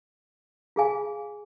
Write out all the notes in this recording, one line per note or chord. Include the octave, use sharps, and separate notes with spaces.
F4 G#4 F5 G#5